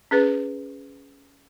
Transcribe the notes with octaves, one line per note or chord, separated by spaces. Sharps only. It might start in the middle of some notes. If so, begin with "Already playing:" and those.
C#4 G#4 B4